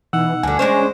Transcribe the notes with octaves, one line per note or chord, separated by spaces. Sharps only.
B2 E3 D#4 F#5 E6
D2 G2 D3 G#5
G#3 C#4 D4 C5 C#5